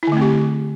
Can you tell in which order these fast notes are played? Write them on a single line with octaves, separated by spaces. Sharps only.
E4 D3 A3 C4 G4